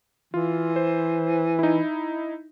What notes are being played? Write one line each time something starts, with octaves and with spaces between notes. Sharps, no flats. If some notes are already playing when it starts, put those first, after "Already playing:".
E3 F4
C5
D#4 E4